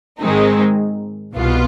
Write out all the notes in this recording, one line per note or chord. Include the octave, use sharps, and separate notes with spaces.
G#2 D#3 G#3 C4 D#4
C2 B2 B3 F4